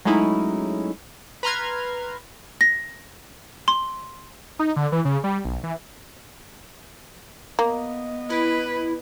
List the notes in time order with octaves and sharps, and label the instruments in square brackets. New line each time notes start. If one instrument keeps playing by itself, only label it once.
[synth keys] F#3 G#3 A3 C#4 D#4 E4
B4 A#5 C6 F6 G#6
[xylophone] A#6
C6
[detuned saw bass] D#4
D3
E3
C#3
G3
B1
E3
[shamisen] A#3 [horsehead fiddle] B3 D#5
[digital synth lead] E4 [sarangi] B4